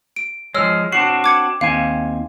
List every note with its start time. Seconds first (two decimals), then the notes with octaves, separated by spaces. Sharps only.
0.16 D7
0.54 F3 G#3 C#5 E6 F6
0.92 C4 D4 F#4 C7
1.24 D6 G#6 C#7
1.61 D#2 C4 F5 G#5